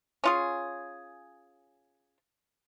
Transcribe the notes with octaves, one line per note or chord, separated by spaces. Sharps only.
C#4 F4 G#4